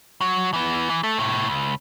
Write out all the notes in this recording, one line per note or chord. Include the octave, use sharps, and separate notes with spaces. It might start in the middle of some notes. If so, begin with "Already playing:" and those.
F#3
E3 B3
E3
A3 A4
A2 C3
C#2